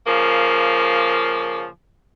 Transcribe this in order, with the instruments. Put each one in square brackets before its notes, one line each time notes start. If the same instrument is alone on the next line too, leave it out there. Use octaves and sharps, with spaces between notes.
[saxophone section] C#3 F3 A#3